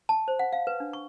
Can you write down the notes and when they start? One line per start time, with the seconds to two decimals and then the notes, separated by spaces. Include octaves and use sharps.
0.09 A5
0.28 C5
0.39 F#5
0.53 F5
0.67 B4
0.80 D4
0.93 C#6